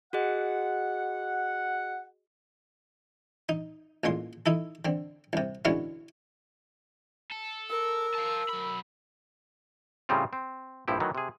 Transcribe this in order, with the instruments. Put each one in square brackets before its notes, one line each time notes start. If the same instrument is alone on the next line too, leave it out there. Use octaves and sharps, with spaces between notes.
[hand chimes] F#4 G#4 D#5 [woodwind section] F#5
[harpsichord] D#4
A1 A#2 G#3 C6
D#4 E4 A4
D3 C4
C2 C3
B2 D3 E3 G#3 B3 C#4
[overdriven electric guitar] A4
[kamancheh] A#4 [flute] E6
[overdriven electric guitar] F5 A5
F#2 B5
[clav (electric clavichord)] A2 C#3 G3 C4 C#4 F4
C4
A#1 G2 F3 E4 G4
D#3 E3 F#3 A3
C3 G#4